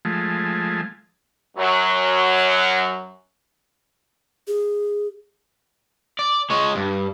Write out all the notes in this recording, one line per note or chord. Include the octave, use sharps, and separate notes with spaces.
F3 G#3 A3
F#2 F#3
G#4
D5
G#3 C#5
G2